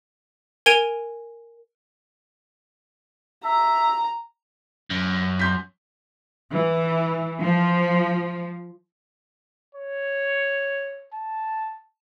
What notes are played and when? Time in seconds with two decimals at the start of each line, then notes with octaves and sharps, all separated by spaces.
0.66 A#4 G#5 G#6 D7 D#7 F7
3.45 E5 A#5
4.90 F#2
5.39 C6 G6 B6
6.53 E3
7.41 F3
9.75 C#5
11.14 A5